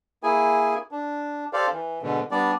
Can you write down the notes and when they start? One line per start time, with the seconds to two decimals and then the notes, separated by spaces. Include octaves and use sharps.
0.23 A#3 E4 G#4 G#5
0.91 D4
1.53 G4 A4 C5 D5 F5
1.72 E3
2.02 G#2 B2 D3
2.31 G3 B3 D4 D5